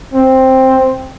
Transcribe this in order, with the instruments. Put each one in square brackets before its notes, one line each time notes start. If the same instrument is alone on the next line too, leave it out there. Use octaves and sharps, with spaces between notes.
[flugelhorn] C4